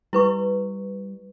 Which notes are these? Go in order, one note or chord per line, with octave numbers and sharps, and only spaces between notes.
G3 E4 B4 C#6